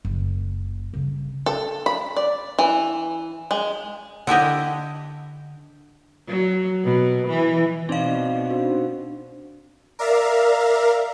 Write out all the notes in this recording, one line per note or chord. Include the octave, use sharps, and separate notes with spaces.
F#1
C#3 G3
A4
B5
D5
E3
G#3
D3 E4 G4 D#5
F#3
B2
E3
B2 C4 D#4 D5 D#5 F5
D4 F#4 C5
A#4 D5 E5 F5 A#5